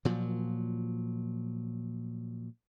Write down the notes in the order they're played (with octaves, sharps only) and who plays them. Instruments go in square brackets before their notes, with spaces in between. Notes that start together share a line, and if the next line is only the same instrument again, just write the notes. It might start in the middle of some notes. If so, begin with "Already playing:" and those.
[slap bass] A#2 F3 F#3